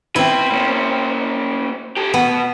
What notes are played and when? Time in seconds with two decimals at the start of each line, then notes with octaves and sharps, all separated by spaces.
0.16 B2 C4 E4 B4
0.52 A#3 C#4
1.97 G4 A4
2.14 B2 B3